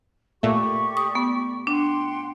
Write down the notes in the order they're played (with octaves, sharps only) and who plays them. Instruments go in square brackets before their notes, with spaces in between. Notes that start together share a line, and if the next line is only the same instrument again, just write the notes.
[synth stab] A#2 A3 [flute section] G4 D5 C#6
[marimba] D#6
B3
[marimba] D4 [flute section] F#5 G5 C6